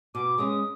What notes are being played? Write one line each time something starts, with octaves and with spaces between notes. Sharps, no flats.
B2 D6
G#3 C#4 D#6